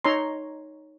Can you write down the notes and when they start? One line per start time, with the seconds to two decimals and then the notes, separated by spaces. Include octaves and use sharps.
0.05 D#4 C#5 A#5 C6